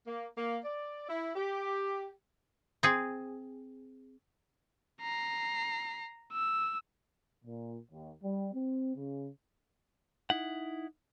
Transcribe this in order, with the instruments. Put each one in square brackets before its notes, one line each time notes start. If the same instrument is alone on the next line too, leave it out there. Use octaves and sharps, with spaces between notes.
[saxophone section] A#3
A#3
D5
E4
G4
[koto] C4 G#4
[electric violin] A#5 C7
E6
[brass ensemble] A#2
D#2
G3
C4
C#3
[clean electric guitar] D#4 E4 F#5